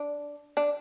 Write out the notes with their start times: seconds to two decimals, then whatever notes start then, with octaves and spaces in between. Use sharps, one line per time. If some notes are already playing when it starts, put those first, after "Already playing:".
Already playing: D4
0.57 D4